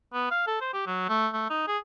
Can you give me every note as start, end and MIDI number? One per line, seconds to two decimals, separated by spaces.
0.14 0.27 59
0.31 0.42 77
0.47 0.56 69
0.61 0.70 72
0.73 0.85 67
0.86 1.04 54
1.09 1.28 57
1.33 1.47 57
1.50 1.67 63
1.68 1.78 68